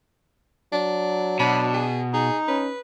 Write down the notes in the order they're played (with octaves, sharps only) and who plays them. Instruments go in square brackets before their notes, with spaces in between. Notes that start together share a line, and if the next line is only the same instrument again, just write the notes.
[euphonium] F#3 [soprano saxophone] D4
[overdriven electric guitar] B2 [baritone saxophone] D4 [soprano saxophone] B5
[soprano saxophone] G#4
[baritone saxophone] D#4 [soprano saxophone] G#4
[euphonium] C#4 [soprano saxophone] B4